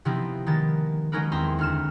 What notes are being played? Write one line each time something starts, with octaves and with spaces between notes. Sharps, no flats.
C3 F3 B3 C4 D#4 E4
D#3 G#3 A#3 B3 A6
F#3 G#3 C#4 D#4 A#4 B4
E2 C4 E4 A#5 C6
D2 F6 E7